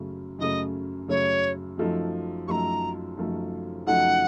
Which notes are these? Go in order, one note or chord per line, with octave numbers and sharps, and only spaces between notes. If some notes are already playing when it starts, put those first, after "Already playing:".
Already playing: F#2 C#3 A3
F#2 C#3 A3 D#5
F#2 C#3 A3 C#5
F#2 F3 A3 D#4 A4
F#2 F3 A3 D#4 A4 A#5 C#6
F#2 F3 A3 D#4 A4
F#2 F3 A3 D#4 A4 F#5